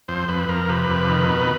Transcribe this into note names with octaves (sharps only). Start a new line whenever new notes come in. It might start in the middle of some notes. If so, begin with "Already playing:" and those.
F2 C5
F2 B4
F2 A#4
C3 B4
F2
D#3
B2